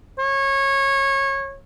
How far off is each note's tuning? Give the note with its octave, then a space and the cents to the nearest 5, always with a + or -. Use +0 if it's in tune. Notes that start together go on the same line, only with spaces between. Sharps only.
C#5 -20